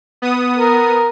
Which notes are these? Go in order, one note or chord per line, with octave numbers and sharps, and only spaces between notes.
B3 D#6
A#4